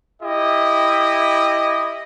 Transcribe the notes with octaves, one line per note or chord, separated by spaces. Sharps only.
E4 G4 D#5